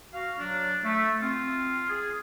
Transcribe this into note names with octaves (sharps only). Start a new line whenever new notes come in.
F#4 F5
F#3 D4
A3
C4 F4
G#4